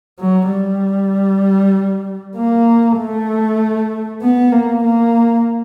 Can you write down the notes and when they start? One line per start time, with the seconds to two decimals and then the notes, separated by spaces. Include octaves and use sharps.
0.20 F#3
0.51 G3
2.37 A#3
2.98 A3
4.22 B3
4.52 A#3
4.84 A#3